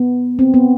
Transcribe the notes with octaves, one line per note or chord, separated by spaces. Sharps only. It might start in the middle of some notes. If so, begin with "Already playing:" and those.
Already playing: B3
C4
B3